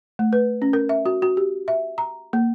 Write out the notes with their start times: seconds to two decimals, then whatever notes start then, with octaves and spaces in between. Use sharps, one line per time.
0.19 A3
0.33 B4
0.62 C#4
0.73 A#4
0.89 E5
1.06 F#4
1.22 F#4
1.37 G4
1.68 E5
1.98 A#5
2.33 A#3